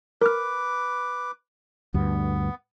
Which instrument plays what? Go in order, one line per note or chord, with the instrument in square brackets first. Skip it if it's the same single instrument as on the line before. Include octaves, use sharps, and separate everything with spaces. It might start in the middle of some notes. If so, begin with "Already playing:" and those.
[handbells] A#4 F6 [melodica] B4 D6
[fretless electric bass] D2 G2 [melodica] B3